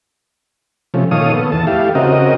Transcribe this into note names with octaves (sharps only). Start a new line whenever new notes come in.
C3 F3 A3 C#4
A#2 D#3 A4 C#5 F5 D#6
B3 A4
E2 A5
A3 E4 G4 F5
C#3 C4 F#4 A#4 D#5